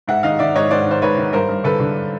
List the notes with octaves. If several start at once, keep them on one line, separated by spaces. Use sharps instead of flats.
G#2 E5 F#5
D#3 D#5 F5
D#3 D5 E5
G#2 C#5 D#5
G#2 C5 D5
D#3 C5
G#2 B4 C#5
D#3
G2 A#4 C5
G2
D3 A4 B4
D3